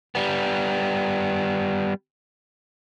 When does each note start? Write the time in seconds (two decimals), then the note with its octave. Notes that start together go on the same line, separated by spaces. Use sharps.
0.15 G3 B3